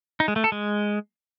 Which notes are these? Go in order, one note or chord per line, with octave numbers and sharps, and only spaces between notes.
D#4
G#3
A3
A4
G#3